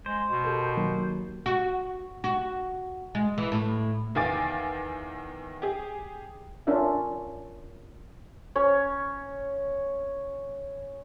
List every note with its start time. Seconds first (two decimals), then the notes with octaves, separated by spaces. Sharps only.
0.06 G#3 C5
0.29 B2
0.44 G4 A4 A#4
0.76 D#3 F#3 A#3
1.46 F#4
2.24 F#4
3.15 G#3
3.38 E3
3.52 A2
4.15 E2 D#3 F5 G#5 D6 A6
5.62 G4 G#4
6.67 C#4 D4 F4 A#4 E5
8.55 C#4 C#5